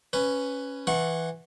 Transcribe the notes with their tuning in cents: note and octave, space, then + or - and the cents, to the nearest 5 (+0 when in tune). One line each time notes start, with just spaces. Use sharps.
C#4 +0 B4 +10
E3 +0 F#5 +0 C#6 -30